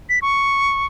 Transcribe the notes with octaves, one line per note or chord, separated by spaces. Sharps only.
B6
C#6